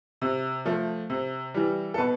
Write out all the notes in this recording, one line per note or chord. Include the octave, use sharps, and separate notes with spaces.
C3
F3 A3
C3
E3 G3
A4
B2 B4